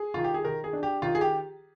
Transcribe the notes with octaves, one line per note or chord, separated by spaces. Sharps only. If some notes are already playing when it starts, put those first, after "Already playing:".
Already playing: G#4
D#3 F4
G4
G#4
D#3 A#4
G#4
D4
G4
D#3 F4
G#4
G4